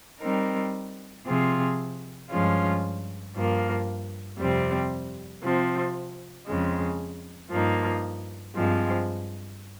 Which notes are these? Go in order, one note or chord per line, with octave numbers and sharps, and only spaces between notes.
G3 C4 D#4 A#4
C3 F3 C4 F4 G#4
G2 F3 G#3 C#4 F4
G2 F3 A#3
F2 C3 G3 C4 G4
C3 F3 C4
F2 C#3 G#3
G2 F3 A#3 D#4
G2 F3 G#3 C4